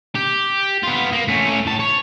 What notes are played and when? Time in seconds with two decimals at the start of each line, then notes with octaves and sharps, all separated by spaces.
0.15 G4
0.83 B3 F4
1.13 A#3
1.28 A3 C#4
1.66 A2 A5
1.80 C#5